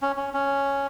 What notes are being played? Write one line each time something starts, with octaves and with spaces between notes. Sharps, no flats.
C#4
C#4
C#4